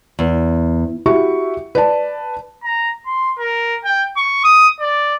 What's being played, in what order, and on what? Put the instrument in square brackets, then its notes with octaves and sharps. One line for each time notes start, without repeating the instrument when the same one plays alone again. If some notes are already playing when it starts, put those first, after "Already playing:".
[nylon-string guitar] E2
[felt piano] E4 F#4 G4 E5 C#6
B4 D5 A5
[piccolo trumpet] A#5
C6
A#4
G5
C#6
D#6
D5